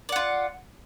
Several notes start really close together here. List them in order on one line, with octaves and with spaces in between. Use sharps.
D5 F#5 F4